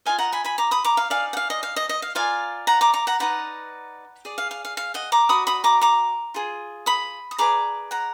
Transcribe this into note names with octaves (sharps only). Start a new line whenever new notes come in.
F4 A#4 D#5 F5 G#5
F#5 A#5
G#5 B5
G#5 B5
A#5 D6
B5 D#6
A#5 D6
F5
D#4 G#4 D5 F5
F#5
F5
D#5
F5
D#5
D#5
F5
F4 A#4 D5 F5 G#5
F#5 A#5
A#5 D6
A#5 D6
F#5 A#5
D#4 F#4 B4 D5 F#5 A#5
G#4 D5
F5
F5
F5
F5
D#5 F#5
A#5 D6
F#4 D5 B5 D#6
B5 D#6
A#5 D6
A#5 D6
F4 G#4
B5 D#6
D#6
G#4 B4 D5 A#5 D6
F#5 A#5